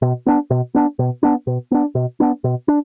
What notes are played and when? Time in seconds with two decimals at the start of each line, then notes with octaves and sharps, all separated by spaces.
0.02 B2
0.26 B3 D4
0.50 B2
0.75 B3 D4
0.99 B2
1.23 B3 D4
1.47 B2
1.71 B3 D4
1.95 B2
2.20 B3 D4
2.44 B2
2.68 D4